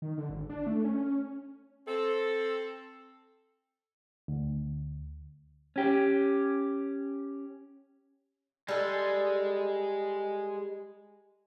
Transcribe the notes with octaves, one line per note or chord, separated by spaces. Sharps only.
D#3
D3
G#1
D4
A3
C#4
C#4
C4 A4
D2
C#4 G4
G3 G#3 A4